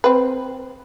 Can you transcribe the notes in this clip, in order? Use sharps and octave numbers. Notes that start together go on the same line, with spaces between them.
C4 B4